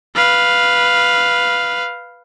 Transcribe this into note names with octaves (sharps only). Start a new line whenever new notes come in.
B4 F5